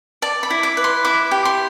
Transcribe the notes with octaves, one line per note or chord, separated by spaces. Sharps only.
D5 A5
B5
E4
D6
B4
C6
E4 D6
G4
C6